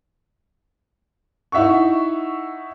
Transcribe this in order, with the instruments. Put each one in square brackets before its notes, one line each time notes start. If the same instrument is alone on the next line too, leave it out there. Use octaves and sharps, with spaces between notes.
[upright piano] D#4 E4 E5 F#5 C#6